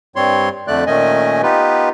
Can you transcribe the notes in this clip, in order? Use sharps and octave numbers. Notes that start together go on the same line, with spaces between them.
G2 G3 C4 C#5 C6
F2 D3 A3 D5 F#6
A#2 D#3 A3 C#4 D#5 G#5
B3 D#4 F4 G4 B4